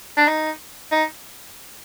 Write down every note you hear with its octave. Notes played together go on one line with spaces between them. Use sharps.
D4
D#4
D#4